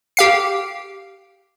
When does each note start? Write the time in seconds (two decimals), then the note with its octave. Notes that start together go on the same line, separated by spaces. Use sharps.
0.17 G4 F5 C7